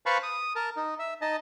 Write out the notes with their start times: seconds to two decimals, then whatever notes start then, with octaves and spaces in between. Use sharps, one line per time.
0.06 B4 C5 F5 A5 B5 C#6
0.23 D#6
0.56 A#4 A5
0.77 D#4
0.99 E5
1.22 D#4 D#5 A5